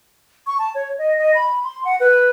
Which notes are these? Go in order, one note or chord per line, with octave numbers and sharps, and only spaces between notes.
C#6
A5
C#5
D#5
D#5
B5
C6
F#5
B4